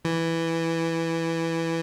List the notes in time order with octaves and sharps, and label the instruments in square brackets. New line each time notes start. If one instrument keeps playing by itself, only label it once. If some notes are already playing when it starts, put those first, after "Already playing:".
[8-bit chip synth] E3